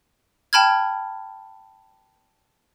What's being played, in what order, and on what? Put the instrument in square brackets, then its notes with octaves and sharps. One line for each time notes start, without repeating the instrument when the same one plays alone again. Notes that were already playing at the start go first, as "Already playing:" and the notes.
[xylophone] G5 A5 B5 F6 G#6